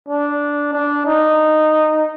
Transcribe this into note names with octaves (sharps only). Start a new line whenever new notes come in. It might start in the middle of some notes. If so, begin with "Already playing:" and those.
D4
D4
D#4